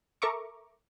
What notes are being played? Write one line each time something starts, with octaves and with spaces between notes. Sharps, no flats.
A4 A#4 E5 A#5 C#6 D6